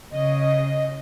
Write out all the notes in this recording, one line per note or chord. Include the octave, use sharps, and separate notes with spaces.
C#3 D#5